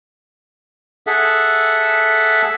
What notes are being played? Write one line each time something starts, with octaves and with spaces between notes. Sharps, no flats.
G#4 A4 E5 F#5